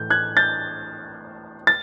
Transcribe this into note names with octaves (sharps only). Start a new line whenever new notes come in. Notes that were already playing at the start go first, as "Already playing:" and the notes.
Already playing: A2 E3 A3 G6
F#6 G#6
G6 A6
A6